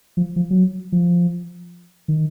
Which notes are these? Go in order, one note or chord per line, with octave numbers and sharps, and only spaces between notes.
F3
F3
F#3
F3
D#3